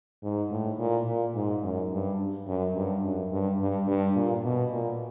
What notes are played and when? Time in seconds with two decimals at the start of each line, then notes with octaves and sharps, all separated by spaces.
0.23 G#2
0.51 A2
0.79 A#2
1.06 A#2
1.35 G#2
1.63 F#2
1.91 G2
2.47 F#2
2.75 G2
3.03 F#2
3.31 G2
3.60 G2
3.87 G2
4.16 A#2
4.44 B2
4.72 A#2